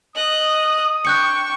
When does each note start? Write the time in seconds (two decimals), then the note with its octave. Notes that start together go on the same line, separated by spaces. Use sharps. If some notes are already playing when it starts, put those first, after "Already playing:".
0.16 D#5 D#6 F#6
1.05 D4 G5 C#6 F#6 G6 C#7